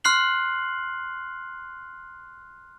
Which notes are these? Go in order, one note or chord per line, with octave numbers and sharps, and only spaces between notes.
C6 F6 F#6 C7 F#7